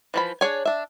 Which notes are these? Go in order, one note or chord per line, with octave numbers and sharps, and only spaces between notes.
E3 F3 B5
D4 G#4 C#5 G#5
D4 E5